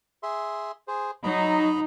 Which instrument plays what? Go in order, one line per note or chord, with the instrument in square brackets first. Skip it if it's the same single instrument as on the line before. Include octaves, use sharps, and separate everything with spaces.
[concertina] G#4 E5 C6
G#4 C5
[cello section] F#3 D#4 [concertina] D#5 A#5 B5